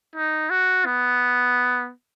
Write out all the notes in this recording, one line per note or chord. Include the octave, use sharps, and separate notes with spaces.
D#4
F#4
B3